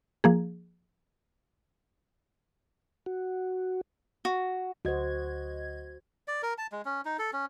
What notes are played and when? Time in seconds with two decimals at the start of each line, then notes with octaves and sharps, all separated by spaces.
0.24 F3 A#3 G#4
3.06 F#4
4.25 F#4
4.85 D2 F#4 C5 D#5 G#6
6.28 D5
6.43 A#4
6.58 A5
6.72 G#3
6.85 C#4
7.05 D#4
7.19 A4
7.33 C#4